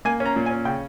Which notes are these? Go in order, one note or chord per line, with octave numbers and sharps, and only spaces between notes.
A#3 G#5
C#4
A#5
A#2
G#5
C#4
C#3 G5